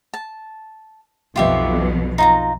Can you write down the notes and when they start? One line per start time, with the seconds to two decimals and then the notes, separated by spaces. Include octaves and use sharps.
0.14 A5
1.36 B1 F2 B2 F4 G4 E5
2.18 D#4 F4 A#5